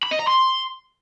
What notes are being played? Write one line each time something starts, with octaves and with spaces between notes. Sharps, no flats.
B5
D#5
A#5
C6